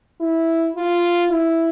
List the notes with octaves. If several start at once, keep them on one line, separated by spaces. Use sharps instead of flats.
E4
F4
E4